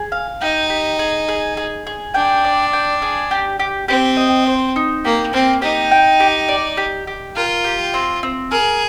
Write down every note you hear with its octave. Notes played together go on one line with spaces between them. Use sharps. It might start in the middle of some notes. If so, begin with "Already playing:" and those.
Already playing: G#4
F5
D#4 G4
G4
G#4
G#4
G#4
G#4
D4 G5
D5
G5
G#4
G4
G4
C4 G4
D#5
C5
D#4
A#3 G4
A#3 C4
D#4 G4
G5
G4
D5
G4
G4
F4 A#4
G4
C4
C4
G#4 A#4